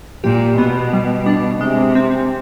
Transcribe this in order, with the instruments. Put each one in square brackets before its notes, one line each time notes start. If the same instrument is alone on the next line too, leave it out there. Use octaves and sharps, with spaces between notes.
[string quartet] A#2 [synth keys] G4
[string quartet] B2 [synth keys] B3
[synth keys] G3
D4
[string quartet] C3 [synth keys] G#3
[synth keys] C4